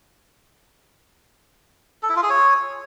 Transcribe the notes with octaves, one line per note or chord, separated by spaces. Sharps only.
A4
E4
F4
G#4
C#5